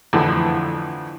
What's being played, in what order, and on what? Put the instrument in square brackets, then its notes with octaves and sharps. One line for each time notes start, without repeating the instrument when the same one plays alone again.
[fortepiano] F2 A2 D3 E3